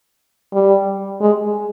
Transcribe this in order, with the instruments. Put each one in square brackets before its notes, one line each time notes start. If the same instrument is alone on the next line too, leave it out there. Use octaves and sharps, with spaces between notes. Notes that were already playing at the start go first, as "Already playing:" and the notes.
[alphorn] G3
G#3